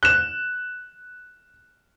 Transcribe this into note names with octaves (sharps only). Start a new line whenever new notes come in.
F#6 E7